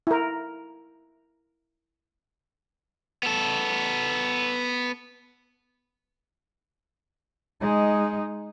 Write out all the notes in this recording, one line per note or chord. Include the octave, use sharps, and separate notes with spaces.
E4 A#4
B3 A4
G#3 D#4